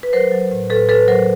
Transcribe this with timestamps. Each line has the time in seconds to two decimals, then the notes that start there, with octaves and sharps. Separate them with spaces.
0.03 B4
0.13 F#3 A#4 C5
0.32 F#3
0.51 A2
0.70 A2 A4 B4
0.89 A2 A4 B4
1.08 F#3 A#4 C5